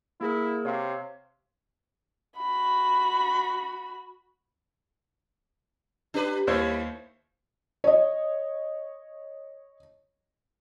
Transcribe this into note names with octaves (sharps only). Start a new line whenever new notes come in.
A#3 E4 G#4 A#4
C3 C#5 F5 C6
F#4 B5
D4 G4 B4
D#2 G3 A#3 E4 C5 C#5
C#5 D#5